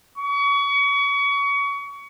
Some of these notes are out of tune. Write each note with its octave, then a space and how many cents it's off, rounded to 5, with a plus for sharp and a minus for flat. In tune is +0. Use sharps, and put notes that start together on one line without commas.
C#6 +30